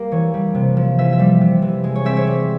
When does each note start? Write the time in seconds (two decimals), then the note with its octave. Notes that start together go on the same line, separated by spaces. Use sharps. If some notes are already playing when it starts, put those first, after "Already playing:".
Already playing: G3 A#3
0.12 E3 C#5
0.34 G3
0.54 C3
0.77 F3
0.98 E3 E5
1.13 E5
1.19 G3
1.41 C3
1.62 E3
1.84 G#3
1.95 C#5
2.05 C4 E5
2.17 C#5
2.27 G3